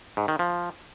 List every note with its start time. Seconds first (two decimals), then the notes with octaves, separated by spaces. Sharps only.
0.17 G#2
0.28 D#3
0.39 F3